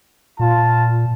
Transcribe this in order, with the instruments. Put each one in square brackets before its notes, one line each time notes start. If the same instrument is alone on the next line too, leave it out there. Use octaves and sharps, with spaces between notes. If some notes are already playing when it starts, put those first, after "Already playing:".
[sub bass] A#2 [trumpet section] F4 A5